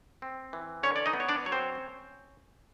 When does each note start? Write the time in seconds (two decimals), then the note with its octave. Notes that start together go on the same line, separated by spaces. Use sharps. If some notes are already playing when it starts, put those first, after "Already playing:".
0.22 C4
0.53 E3
0.83 D3 C#4 C#5
0.96 D5
1.06 D#4 D#5
1.13 B3
1.20 C#5
1.29 D4 D5
1.45 F#3 C#5
1.52 C4 C5
1.75 C#4